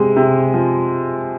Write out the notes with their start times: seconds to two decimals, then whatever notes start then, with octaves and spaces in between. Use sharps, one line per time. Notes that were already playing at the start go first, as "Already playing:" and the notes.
Already playing: C3 G#3
0.17 C3
0.54 F3